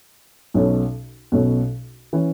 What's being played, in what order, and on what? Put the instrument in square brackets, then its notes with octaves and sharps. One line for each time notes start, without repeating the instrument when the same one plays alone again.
[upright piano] B1 B2 F#3 C#4 A4
B1 B2 F#3 C#4 A4
E3 C#4